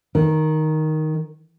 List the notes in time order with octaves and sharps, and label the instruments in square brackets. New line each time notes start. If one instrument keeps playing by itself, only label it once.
[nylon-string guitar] D#3